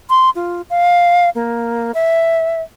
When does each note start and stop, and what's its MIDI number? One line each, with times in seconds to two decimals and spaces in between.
0.10 0.30 84
0.35 0.62 65
0.70 1.30 77
1.35 1.92 58
1.94 2.62 76